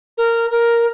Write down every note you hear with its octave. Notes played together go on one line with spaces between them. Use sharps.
A#4
A#4